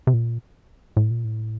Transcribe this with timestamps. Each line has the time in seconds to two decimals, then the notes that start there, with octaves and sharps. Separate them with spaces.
0.07 C3
0.13 A#2
0.97 A2
1.11 A#2
1.24 A2